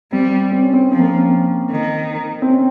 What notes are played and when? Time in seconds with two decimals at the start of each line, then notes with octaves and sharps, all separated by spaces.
0.12 G3 C4
0.51 C4
0.62 C#4
0.73 C4
0.92 F3 C4
1.00 A#3
1.08 C4
1.70 D#3
2.42 C4
2.49 C#4